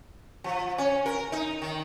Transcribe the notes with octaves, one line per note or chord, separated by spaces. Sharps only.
F3
C#4
A#4
D#4
D#3